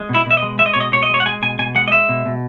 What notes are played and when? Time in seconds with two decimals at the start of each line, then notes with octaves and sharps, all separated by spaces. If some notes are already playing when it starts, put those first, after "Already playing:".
Already playing: G#3
0.09 B2
0.14 E4
0.26 B2 E5
0.37 D#5
0.42 G#3
0.59 G#3 E5
0.66 D#5
0.74 B2 C#5
0.80 D#5
0.92 B2 C#5
1.03 D#5
1.09 G#3 C#5
1.20 F#5
1.26 G#3 G#5
1.42 B2 G#5
1.59 B2 G#5
1.75 G#3 F#5
1.88 D#5
1.92 G#3 E5
2.09 B2
2.26 B2